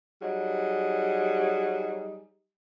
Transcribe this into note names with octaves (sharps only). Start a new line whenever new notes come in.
F#3 G3 D#4 G#4